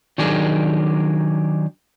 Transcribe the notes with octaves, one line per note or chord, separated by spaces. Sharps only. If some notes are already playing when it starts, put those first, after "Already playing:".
D#3 F#3 D4 G4 G#4 A#4